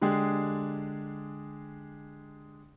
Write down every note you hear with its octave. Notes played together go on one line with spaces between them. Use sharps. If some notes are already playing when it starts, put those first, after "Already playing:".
D3 G#3 D4 G4 G#4